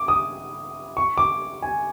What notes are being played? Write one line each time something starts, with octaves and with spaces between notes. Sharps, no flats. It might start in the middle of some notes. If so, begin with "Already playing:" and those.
Already playing: D6
D#6
C#6
D6
G#5